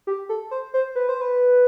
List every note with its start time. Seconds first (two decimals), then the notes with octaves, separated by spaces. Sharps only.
0.07 G4
0.29 A4
0.51 C5
0.74 C5
0.96 B4
1.09 C5
1.21 B4